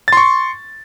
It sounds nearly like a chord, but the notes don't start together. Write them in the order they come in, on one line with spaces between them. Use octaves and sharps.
A6 C6 C#6